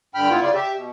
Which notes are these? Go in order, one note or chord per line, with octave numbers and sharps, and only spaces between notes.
G2 D3 G5 B5 F6
B3 E4 F4
C#3 F4 D5
G4 E5
B2